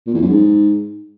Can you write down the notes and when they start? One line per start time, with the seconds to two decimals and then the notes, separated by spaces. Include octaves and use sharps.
0.07 A#2
0.14 E2
0.22 F#2
0.29 G#2